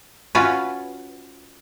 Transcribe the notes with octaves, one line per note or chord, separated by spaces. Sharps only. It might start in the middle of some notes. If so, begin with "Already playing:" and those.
C#4 F4 F#4 B4